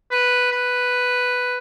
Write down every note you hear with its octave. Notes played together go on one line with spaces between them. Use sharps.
B4
B4